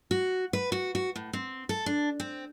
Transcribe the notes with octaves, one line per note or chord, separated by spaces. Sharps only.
F#4
B4
F#4
F#4
A2
C4
A4
D4
C4